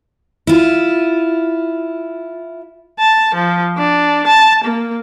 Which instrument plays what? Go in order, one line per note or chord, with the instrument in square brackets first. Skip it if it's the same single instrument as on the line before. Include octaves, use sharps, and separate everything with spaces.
[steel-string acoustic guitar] E4 F4
[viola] A5
F3
D4
A5
A#3